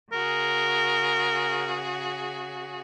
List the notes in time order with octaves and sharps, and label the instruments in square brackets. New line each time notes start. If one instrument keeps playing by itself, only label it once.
[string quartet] C#3 F#4 G#4 [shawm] A#4